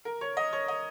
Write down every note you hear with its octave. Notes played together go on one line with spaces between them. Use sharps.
A#4
C#5
D#5
C#5
D#5